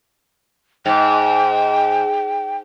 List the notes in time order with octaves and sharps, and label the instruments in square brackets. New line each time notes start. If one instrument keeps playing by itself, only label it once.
[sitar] G#2 [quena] G5